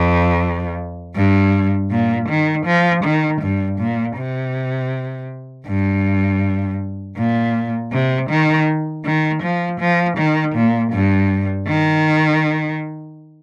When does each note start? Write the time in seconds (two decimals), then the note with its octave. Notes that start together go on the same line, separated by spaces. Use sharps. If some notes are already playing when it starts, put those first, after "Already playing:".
Already playing: F2
1.15 G2
1.91 A#2
2.29 D#3
2.66 F3
3.04 D#3
3.42 G2
3.79 A#2
4.17 C3
5.66 G2
7.17 A#2
7.92 C3
8.30 D#3
9.05 D#3
9.43 F3
9.80 F3
10.17 D#3
10.55 A#2
10.93 G2
11.67 D#3